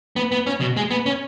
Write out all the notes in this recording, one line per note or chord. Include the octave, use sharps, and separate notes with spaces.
B3
B3
C#4
B2
G#3
B3
C#4